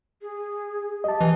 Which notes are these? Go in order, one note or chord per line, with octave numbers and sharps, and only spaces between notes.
G#4
G4 D#5 A5
E3 G#5